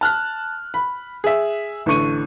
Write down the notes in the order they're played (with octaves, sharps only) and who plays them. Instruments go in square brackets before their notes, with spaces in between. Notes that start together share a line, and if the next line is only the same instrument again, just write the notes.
[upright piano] A5 F6 F#6
B5
G#4 E5
A1 D3 C#6 D#7